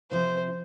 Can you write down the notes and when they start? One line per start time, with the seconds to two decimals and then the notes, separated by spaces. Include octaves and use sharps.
0.11 C3 F3 C4 F4 C5